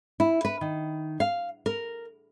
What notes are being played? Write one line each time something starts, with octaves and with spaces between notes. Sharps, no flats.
E4
B4
D#3
F5
A#4